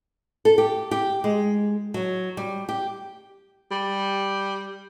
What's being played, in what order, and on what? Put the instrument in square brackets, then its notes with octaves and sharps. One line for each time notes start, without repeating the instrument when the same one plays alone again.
[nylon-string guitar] A4
G4
G4
G#3
F#3
G3
G4
[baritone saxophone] G3